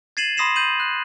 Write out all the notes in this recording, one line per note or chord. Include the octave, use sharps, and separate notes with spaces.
G#6 A6 C7 D#7 E7 F#7
B5 C6 D#6 A#6 C7 E7
G6 D#7 F#7
F#6